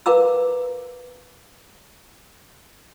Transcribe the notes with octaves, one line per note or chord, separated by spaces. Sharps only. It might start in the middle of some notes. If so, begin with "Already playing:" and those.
A#4 B4 F5 A#5 D6 E6